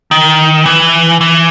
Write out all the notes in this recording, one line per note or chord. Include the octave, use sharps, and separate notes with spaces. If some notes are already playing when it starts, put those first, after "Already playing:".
D#3
E3
E3